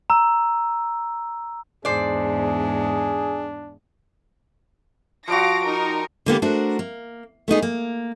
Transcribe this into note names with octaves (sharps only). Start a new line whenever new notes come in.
A#5 E6
E2 G#2 D4 G#4 C5 D5
F3 G3 F#4 F5 A#6 D7
D#4 A#4
D3 A#3 B3 G4
A3 D4 F#4 A#4 C5
A#3
A3 B3 D#4 G#4
A#3